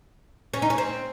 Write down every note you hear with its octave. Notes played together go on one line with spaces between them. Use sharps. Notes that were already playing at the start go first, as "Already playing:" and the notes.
C#4
D#4
C#4
C4